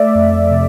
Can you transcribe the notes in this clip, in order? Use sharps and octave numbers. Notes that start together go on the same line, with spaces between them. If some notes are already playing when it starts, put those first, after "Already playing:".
Already playing: A3 D5 E5
F2
C3